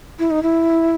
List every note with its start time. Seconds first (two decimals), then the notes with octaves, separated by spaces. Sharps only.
0.19 E4
0.31 D#4
0.43 E4